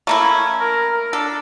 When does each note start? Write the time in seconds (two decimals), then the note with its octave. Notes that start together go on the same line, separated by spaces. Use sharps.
0.07 A3 A#3 E4
0.20 C#4
0.60 A#4
0.92 A#4
1.13 D4 A4